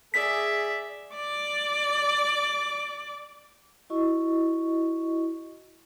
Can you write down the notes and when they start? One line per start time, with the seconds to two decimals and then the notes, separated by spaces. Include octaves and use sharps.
0.14 G#4 D5 E5 B6
1.16 D5 D6
3.90 E4 F#4 D#5 C#6